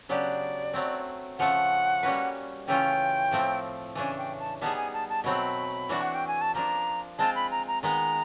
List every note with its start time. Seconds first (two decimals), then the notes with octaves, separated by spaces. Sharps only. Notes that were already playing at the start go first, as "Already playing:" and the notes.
0.09 C#3 F#3 B3 D4 G4 D5
0.74 F#3 A3 C4
1.39 C#3 F3 A3 F#5
2.03 G3 A#3 C#4 F#4 B4
2.68 C#3 E3 A3 C#4 F4 G5
3.31 A2 F3 A3 C4
3.95 C#3 E3 A3 D4 G#5
4.18 G5
4.39 A5
4.61 G3 B3 D#4 G#4 A5
4.77 G#5
4.93 A5
5.09 A5
5.24 B2 F#3 A3 C4 B5
5.89 E3 A3 D4 F#4
6.01 F#5
6.14 G5
6.27 G#5
6.41 A5
6.54 F3 A#3 D4 A#5
7.19 G#3 C4 F4 A5
7.35 B5
7.51 A#5
7.67 A#5
7.83 D#3 G#3 B3 A#5